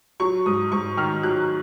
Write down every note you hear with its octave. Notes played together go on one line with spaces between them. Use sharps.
F#3 C#6
G#2 D#6
G#2 C#6
D#3 F6
F#3 F#6